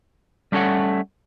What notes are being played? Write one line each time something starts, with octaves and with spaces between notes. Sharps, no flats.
G3 A3 C#4 A4 C#5 F#5